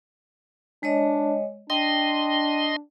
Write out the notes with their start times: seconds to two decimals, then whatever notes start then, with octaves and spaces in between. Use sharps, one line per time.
0.83 G#3 D4 C#5 D#5
1.70 D4 D#5 G5 C6